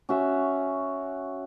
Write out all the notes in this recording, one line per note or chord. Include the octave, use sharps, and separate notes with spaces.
C#4 F#4 E5